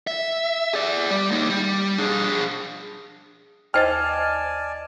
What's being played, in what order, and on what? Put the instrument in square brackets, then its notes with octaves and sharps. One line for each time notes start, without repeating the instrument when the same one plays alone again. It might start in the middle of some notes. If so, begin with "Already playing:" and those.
[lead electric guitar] E5
G#4 D5
G3
A#3 D#4
G3
D4 G#4
[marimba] D#2 C5 A6 [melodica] D5 G#5 A5 [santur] D#5 [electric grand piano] F6